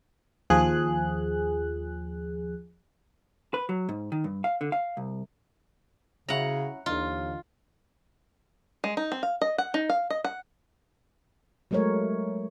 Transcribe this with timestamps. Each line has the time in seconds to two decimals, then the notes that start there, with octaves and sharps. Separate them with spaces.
0.50 D#2 F3 G#4 F#6
3.54 B4
3.69 F#3
3.89 G#2
4.12 D#3
4.24 G2
4.44 F5
4.61 D3
4.72 F5
4.97 C2
6.28 C#3 C#4 E4 F#4 F#5 A#5
6.86 D#2 D3 E3 D#4 F4
8.84 G#3
8.97 D#4
9.12 C4
9.23 F5
9.42 D#5
9.58 F#5
9.74 D#4
9.89 F5
10.10 D#5
10.24 F#5
11.71 F#3 G#3 A3 A#4 C#5